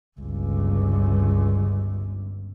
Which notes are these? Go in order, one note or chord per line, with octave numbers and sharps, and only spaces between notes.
G1 C#2